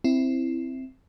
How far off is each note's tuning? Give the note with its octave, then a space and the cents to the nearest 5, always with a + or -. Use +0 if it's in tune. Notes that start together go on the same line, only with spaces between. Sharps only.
C4 +0 E4 +0